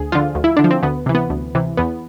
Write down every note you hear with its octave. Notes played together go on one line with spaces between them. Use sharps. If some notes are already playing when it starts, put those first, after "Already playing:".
Already playing: D2 G#4
D3 F3 F4
D2
E4
D3 D4
F3
C4
D2 B3
C3 E3
B3
D2
C3 E3
E2 B3